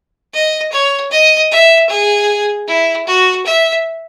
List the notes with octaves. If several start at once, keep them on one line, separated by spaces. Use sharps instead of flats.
D#5
C#5
D#5
E5
G#4
E4
F#4
E5